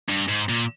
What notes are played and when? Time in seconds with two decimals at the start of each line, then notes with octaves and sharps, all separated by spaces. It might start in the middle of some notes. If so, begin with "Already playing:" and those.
0.09 G2
0.28 G#2
0.49 A#2